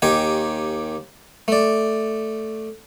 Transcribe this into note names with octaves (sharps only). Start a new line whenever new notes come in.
D#2 D#3 G4 G#5
A3 D5